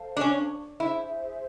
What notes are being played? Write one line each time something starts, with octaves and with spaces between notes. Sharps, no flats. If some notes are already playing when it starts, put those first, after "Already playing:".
Already playing: A4 C5 F5 A5
D4
C#4
E4 G#4 C5 E5